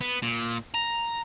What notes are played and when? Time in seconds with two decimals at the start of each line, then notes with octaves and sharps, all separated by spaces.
0.01 B3
0.22 A#2
0.74 A#5